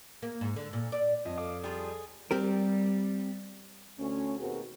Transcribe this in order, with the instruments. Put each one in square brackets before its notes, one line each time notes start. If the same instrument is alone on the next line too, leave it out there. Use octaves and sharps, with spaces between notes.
[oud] A#3
G#2
D3
A#2
D5
[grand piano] F2 [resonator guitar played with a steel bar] D#5
[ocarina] A4 [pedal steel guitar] F5 D6 D#6
[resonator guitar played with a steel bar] G3 F4 [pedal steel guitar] G#4
[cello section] G3 [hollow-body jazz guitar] C4 G4 A#4
[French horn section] D2 A3 C#4
D#2 B2 C4 F#4 G#4 A#4